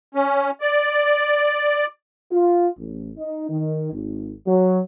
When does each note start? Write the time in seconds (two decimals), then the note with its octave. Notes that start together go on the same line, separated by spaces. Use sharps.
0.15 C#4
0.61 D5
2.31 F4
2.77 A1
3.18 D#4
3.50 D#3
3.92 G#1
4.47 F#3